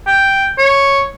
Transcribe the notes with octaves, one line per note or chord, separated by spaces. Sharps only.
G5
C#5